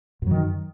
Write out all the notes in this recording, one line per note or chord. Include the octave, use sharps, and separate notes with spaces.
F#2 D#3 F#3